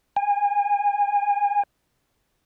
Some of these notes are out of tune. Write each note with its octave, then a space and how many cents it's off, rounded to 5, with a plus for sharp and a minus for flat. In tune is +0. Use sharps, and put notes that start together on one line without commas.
G#5 -30